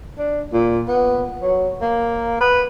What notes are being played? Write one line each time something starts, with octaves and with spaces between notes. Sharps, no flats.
D4
A#2
B3
F#3
A#3
B4